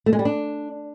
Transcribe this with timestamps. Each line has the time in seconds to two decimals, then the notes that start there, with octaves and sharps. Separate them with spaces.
0.06 A3
0.13 G#3
0.19 G3
0.25 D4